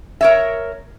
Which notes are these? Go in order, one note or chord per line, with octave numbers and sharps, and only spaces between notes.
A#4 C#5 E5